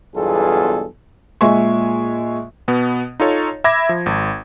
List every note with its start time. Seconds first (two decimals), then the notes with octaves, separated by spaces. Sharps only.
0.15 B1 E2 G2 F4 G#4 A4
1.41 A#2 G#3 E5 G#5 C#6
2.68 B2 B3
3.20 D#4 F4 A4 C#5
3.64 E5 B5 D6 G#6 A#6
3.89 F3
4.06 G#1